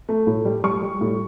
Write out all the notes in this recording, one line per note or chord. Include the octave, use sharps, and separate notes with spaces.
A3
A2
G3
G3 C#6
G3
A2